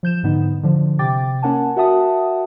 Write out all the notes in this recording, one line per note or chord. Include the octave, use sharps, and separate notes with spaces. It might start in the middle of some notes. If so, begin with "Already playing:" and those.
F3 G6 E7
G#2 D3 B3 D#4
D3 F3
C3 G5 D6 A6
A#3 C#4 A#4 F#5 G#5 A5
F#4 A#4 E5 F#5 A5 D#6